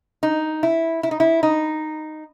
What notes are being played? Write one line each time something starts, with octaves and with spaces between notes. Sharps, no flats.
D#4
E4
E4
D#4
E4
D#4